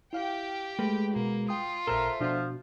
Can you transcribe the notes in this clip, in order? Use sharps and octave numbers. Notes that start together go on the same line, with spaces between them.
E4 G4 F5 G5
G#3 A3 B4
B2 A#3 F#4
F4 G5 D#6
A1 A#2 A4 A#4 C5 E5
B2 F3 D4 F#4